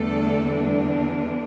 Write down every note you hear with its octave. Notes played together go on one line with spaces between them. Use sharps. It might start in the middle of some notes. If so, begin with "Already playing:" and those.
Already playing: E2 D3 G3 A3 D4 A4